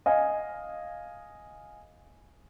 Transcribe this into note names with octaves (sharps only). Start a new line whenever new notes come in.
D#5 F5 G#5